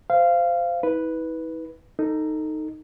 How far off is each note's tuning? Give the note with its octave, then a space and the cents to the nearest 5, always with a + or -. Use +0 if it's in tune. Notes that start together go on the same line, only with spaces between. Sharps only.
C5 -15 F5 -15
E4 -45 B4 +0
D#4 +0 A4 +20